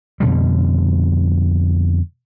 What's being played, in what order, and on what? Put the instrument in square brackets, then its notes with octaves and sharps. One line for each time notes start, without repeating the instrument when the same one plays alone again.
[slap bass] F2 B2 D3 G3